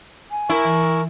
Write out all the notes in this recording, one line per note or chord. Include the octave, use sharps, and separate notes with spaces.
G#5
E4 A#4 C#6
E3